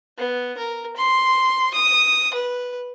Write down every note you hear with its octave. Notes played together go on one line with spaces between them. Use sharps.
B3
A#4
C6
D#6
B4